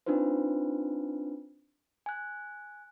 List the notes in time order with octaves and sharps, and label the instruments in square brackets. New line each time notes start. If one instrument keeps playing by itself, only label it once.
[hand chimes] C4 D4 D#4 F4 B4 C5
G#5 F#6